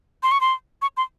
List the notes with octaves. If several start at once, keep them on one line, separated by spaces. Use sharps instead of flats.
C6
C#6
C6
C#6
C6